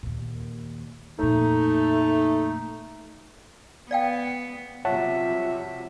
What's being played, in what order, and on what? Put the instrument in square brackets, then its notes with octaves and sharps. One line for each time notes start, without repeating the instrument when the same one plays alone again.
[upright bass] D#2 A#2
[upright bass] F2 A#2 [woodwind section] A3 D#4
[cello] B3 [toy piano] D5 F5 G5
[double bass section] C3 F#3 G3 [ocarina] F4 [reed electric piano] C#5 F#5 A5 [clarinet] E5